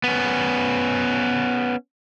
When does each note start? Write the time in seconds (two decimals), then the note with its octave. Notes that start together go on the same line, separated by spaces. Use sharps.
0.04 B3 C#4